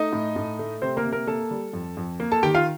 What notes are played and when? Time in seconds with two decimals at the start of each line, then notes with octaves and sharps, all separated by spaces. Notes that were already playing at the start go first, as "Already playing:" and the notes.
Already playing: A3 D#4 D#5
0.13 A2
0.36 A2
0.59 A3
0.82 C3 C4 C5
0.97 A#3 A#4
1.05 C3
1.12 A#3 A#4
1.27 A#3 A4 A5
1.51 G3
1.73 F2
1.97 F2
2.20 A#3
2.32 A4 A5
2.43 D#3 G4 G5
2.54 F4 F5